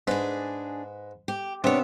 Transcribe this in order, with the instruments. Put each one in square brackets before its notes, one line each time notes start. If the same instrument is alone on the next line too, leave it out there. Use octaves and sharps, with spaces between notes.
[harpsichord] G#2 B4 B5 [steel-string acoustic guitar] D4 G#4
[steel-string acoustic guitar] G4
[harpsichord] C3 B3 [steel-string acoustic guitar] D4 C#5